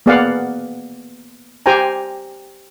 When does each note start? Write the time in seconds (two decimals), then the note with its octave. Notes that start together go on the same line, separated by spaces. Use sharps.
0.06 A#3 B3 G#4 D5 F5 F#5
1.66 G4 C5 G5 G#5 A#5